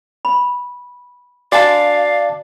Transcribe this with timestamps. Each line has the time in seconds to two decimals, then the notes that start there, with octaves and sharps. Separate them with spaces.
0.25 B5
1.52 F#4 D5 F5 G#5 A5